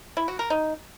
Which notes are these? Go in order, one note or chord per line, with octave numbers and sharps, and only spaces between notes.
E4
F#4
A#4
D#4